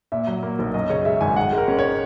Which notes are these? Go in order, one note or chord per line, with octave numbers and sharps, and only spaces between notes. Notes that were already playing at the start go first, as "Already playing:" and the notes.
A#2 E5
F#3
A#3
B1
F#2 D#5
C#3 C#5
G#3 E5
G#1 G#5
D#3 F#5
G#3
A#4
C#4
C#5